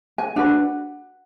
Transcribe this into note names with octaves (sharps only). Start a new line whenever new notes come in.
G#5
D4 F#4 B4 F#5